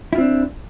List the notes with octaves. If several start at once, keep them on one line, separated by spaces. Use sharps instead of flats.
C4 D4 E4 F4